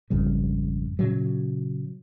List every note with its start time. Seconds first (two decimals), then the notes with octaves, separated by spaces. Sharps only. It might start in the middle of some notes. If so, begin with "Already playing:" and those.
0.10 G#1 F2 C#3 G3
0.99 A#2 C#3 F#3